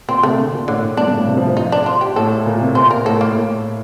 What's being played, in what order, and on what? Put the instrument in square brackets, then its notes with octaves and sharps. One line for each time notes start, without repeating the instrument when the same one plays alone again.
[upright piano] A#2 [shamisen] C4
[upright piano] C3 [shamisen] A3
[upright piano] D3
A#2
[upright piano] A2 [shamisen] D3
[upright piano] A2
[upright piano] G2 [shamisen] D4
[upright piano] G2
A2
C3
F3
F3
[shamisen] D#4
D4
F4
G4
[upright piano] A2 [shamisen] A4
[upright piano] A#2
C3
[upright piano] A#2 [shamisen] C5
[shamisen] A#4
[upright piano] A2 [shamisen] A4
[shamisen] A#3
[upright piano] A2